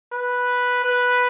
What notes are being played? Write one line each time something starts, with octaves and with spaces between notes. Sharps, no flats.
B4
B4